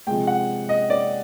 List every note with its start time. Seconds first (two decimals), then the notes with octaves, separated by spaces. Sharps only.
0.07 C3 F3 G#3 G5
0.27 F#5
0.69 D#5
0.90 D5